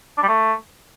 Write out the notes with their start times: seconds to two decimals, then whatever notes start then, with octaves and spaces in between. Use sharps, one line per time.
0.17 D4
0.23 G3
0.28 A3